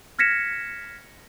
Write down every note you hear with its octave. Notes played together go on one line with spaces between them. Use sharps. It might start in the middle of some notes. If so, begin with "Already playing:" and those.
F6 G#6 A#6 B6 C#7 E7